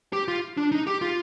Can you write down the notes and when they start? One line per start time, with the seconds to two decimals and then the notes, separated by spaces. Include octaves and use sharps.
0.13 G4
0.28 F4
0.57 D4
0.72 D#4
0.87 G4
1.01 F4